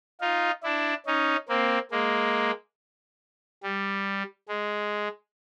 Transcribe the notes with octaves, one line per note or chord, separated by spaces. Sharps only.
D#4 F4
D4 E4
C#4 D#4
A#3 C4
G#3 A#3
G3
G#3